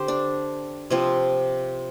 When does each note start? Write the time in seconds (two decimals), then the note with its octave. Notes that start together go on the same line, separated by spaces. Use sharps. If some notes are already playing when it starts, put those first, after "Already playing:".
Already playing: D3 C4 G4 C5
0.08 D4
0.90 C3 F3 C4